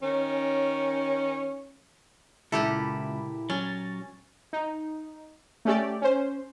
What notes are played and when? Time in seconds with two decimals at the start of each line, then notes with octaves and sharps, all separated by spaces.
0.02 D#3 C#4
2.52 C#2 A#2 E4 G4 A4 B5
3.50 F#3 C#4 A6
4.53 D#4
5.65 A3 C#4 G4 D5
6.02 C#4 C5